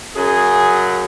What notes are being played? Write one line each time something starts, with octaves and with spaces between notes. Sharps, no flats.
F#2 C#3 F#3 G#4